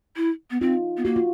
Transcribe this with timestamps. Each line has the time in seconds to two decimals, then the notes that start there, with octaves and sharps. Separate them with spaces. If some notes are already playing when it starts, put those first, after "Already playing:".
0.16 E4
0.51 B3
0.61 C4 D#4 F4
0.97 B3
1.05 A#3 F#4
1.16 F4